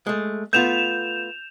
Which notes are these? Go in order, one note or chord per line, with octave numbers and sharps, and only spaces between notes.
G#3 A3
A3 B3 F4 G6 E7 F7